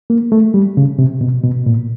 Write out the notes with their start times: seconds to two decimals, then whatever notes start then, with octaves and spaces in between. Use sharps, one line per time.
0.10 A#3
0.32 A3
0.54 G3
0.77 C#3
0.99 C3
1.21 B2
1.44 B2
1.66 A#2